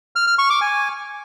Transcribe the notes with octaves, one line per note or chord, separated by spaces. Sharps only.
F6
F6
C#6
D6
G#5